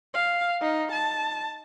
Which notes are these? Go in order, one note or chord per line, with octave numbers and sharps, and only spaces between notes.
F5
D#4
A5